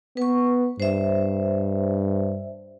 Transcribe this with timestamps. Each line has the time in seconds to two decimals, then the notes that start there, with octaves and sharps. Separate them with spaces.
0.17 B3 B4 C#6
0.80 G2 C5 E5